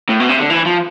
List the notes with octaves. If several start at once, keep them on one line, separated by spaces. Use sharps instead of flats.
A2
B2
C3
D3
E3
F3